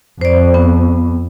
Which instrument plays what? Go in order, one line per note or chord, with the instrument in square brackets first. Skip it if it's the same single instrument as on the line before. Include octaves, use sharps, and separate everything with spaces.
[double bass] F2 [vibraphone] C5 D5
[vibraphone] B3